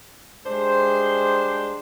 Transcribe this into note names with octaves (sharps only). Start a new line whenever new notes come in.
G3 G#3 D4 C5